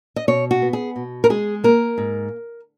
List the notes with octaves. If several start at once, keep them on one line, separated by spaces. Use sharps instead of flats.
D#5
B2 C#5
F#4
B3
G#4
B2
A#4
G#3 G#4
A#3 A#4
G#2